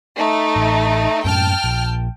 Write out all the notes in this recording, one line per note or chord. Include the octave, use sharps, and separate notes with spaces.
A3 D#4
A1
F#2 A2 C#4 G5 A5 F6
A#1